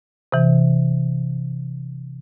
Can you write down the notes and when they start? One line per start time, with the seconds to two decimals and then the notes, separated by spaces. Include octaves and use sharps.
0.32 C3 E3